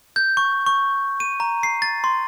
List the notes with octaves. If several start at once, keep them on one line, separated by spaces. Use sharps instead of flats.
G6
C#6
C#6
D#7
A#5
C7
A6
C6